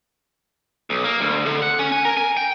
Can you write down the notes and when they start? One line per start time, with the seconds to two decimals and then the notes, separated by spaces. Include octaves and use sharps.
0.90 B1
1.04 A#3
1.21 D2
1.46 D3
1.62 F#5
1.79 C#4
1.92 G#5
2.05 A#4
2.17 G#5
2.37 G5